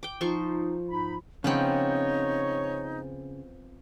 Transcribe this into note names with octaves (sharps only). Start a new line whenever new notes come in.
G5 D6
F3 D#4 C5 C#6
G#2 D#4 B5
C#3 F3 B3 C4 D#4 C#5